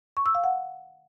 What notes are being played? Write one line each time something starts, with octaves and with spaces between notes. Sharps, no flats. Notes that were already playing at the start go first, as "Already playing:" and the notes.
C#6
E6
F5
F#5